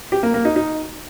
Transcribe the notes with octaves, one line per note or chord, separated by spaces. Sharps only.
G4
A#3
A#3
D#4
D#4